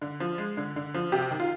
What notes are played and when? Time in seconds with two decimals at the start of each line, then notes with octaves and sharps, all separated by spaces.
0.02 D3
0.20 F3
0.38 G#3
0.57 D3
0.76 D3
0.94 F3
1.12 C3 G4
1.31 D#3
1.40 F4